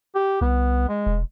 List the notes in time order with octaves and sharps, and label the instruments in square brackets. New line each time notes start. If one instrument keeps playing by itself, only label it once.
[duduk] G4
[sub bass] C2 [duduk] B3
[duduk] G#3
[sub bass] E1